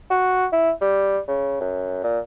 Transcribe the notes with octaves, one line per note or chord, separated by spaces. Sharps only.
F#4
E4
G3
C#3
F#2
A#2